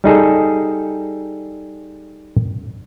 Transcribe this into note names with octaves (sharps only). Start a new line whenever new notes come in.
G3 D#4 G#4 A4